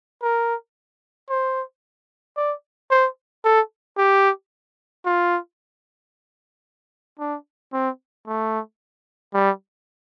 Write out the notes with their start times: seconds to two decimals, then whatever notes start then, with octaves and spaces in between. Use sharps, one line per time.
0.22 A#4
1.29 C5
2.37 D5
2.91 C5
3.44 A4
3.97 G4
5.05 F4
7.19 D4
7.73 C4
8.27 A3
9.34 G3